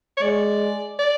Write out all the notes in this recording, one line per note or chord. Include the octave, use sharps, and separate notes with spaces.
C#5
G#3 D5
D5